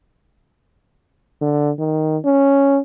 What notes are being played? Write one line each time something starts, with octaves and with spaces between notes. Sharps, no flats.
D3
D#3
C#4